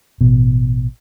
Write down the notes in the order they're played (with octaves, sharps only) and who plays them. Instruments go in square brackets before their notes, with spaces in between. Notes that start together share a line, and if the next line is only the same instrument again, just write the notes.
[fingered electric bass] A1 B2